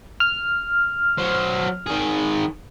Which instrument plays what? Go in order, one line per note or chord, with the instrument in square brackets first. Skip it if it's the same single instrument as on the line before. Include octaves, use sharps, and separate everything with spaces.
[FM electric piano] F6
[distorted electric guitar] F#3 C5
D#3 G#4